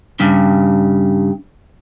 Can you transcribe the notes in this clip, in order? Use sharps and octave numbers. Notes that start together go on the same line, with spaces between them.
G2 C#3